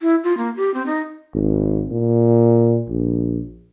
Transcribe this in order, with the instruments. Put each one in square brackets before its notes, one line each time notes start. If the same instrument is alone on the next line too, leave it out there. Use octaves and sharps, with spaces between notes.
[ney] E4
F4
A#3
G4
C4
D#4
[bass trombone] G#1
A#2
A#1